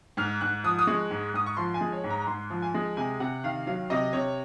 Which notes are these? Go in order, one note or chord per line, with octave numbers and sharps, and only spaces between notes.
G#2 F6
G#2 F#6
F3 D#6
D#6
G#3 C#6
G#2
G#2 D#6
C#6
F3 C6
G#5
G#3
C#5
G#2
A#5
A#5
G#2 C6
F3
G#5
G#3
C3 G#5
C3 F#5
D#3 F5
F#3 F5
C3 D#5
C3 C#5